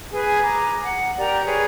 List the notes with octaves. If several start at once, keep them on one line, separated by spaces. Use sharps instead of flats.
G#4 B4 G#5
A#5 D6
F#5
G4 A#4 D5 A#5
G#4 B4 C#5